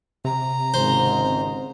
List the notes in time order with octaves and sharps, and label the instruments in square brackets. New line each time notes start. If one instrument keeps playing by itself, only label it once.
[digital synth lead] C3 [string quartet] A#5
[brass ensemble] G#1 C#2 G#2 [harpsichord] C5